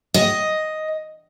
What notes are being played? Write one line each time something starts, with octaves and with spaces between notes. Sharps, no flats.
D#5